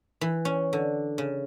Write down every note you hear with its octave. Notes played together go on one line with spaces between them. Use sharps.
E3
C#4
D3
C#3